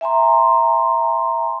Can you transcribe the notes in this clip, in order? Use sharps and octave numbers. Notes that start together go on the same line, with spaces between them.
E5 G#5 A#5 C6